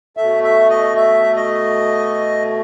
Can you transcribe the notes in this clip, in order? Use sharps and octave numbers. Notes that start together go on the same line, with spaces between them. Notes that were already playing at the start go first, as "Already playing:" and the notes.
B2 A3 E5
E5
D#5
E5
D#5